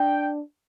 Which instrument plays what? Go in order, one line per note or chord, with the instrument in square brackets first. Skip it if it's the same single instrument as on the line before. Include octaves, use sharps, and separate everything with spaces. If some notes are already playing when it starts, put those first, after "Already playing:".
Already playing: [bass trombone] D4 [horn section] G5